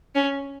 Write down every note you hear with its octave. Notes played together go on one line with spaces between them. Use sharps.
C#4